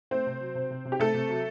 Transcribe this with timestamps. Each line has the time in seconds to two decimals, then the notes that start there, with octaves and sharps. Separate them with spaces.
0.11 A3 C4 C5
0.26 C3
0.41 F#3
0.55 C3
0.70 C3
0.85 C3
0.92 G4
0.99 C3 A3 A4
1.14 C3
1.29 F#3